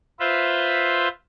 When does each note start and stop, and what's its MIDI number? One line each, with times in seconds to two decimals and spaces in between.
0.20 1.08 65
0.20 1.08 71
0.20 1.08 72
0.20 1.08 76